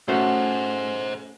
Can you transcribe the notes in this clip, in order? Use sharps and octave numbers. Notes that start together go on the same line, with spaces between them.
A3 C#4 F#4 G#4 C5